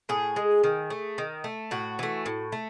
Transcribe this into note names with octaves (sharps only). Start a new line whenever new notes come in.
A2 G#4
G#3
D#3
A3
D#3
A3
A2 F#4
E3 A3
A2
A3